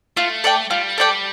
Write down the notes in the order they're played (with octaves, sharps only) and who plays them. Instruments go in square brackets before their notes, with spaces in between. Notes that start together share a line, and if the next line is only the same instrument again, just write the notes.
[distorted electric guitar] A3 [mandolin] F4
[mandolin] A4 D5 G5
[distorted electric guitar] G3 [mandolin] F4
[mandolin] A4 D5 G5